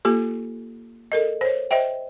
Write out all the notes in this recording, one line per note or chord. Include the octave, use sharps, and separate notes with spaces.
A#3 F4 G4 A4
A4 A#4 D#5
C5 C#5
C5 D#5 E5 G5